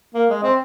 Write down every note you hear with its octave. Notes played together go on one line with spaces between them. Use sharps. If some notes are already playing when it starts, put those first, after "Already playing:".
A#3
G#3
C4